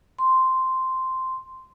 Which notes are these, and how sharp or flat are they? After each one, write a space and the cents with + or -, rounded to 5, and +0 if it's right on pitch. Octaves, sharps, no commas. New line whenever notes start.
C6 -5